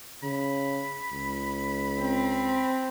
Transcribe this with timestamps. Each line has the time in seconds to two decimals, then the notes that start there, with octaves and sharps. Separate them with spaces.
0.23 C#3 B5
1.12 C#2
2.01 C4